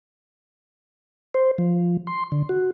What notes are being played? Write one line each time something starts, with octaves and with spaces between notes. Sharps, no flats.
C5
F3
C6
D3
F#4